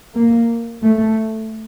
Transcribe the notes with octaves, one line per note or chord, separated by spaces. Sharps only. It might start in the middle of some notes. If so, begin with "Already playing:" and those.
A#3
A3